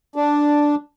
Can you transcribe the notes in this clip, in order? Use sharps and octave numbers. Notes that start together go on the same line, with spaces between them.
D4